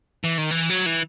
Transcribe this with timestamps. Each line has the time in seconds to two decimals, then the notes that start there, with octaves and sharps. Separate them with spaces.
0.24 E3
0.38 D#3
0.50 E3
0.69 F#3
0.86 E3